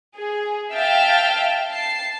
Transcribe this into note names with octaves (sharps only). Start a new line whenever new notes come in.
G#4
E5 F5 G5 A5
A5 C7